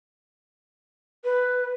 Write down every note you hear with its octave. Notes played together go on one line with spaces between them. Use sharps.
B4